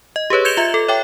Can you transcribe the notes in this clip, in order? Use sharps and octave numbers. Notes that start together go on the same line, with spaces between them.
D#5
G4 G#4 B4 C#5
G6 G#6 C#7 E7 F7 G7
F4 E5
A4
C#5 E5 G5 D6